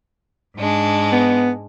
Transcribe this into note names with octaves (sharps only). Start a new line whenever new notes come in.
G#2 G#3 D4
B3